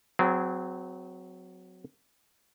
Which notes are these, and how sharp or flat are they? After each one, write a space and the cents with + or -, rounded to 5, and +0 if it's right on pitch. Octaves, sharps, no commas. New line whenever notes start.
F#3 -5 C4 -30 G#4 +0